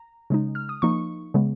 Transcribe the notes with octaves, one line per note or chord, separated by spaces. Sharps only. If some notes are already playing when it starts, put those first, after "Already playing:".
Already playing: A#5
C#3 G#3 D#4
F6
D#6
F3 A#3 D#4 C#6
C#3 G#3 B3